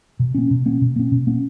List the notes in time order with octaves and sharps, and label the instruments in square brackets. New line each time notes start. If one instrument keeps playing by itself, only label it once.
[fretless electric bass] B2
A#3 C#4
B2
A#3 C#4
B2
A#3 C#4
B2
A#3 C#4